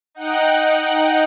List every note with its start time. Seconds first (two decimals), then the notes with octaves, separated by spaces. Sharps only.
0.15 D#4 F#5 G5 F#6